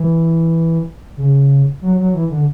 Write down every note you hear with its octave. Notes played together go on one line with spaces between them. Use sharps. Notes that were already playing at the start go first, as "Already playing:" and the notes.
Already playing: E3
C#3
F#3
F#3
E3
D3